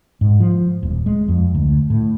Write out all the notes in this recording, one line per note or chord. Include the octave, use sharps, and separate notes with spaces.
G#2
F3
D#1
G#3
F2
D2
A2